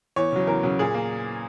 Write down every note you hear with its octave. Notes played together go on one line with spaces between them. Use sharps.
E2 C#5
C#3 F#3
E2 A#4
C#3 F#3
A#2 G#4
A#3